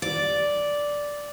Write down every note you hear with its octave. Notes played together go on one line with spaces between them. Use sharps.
D5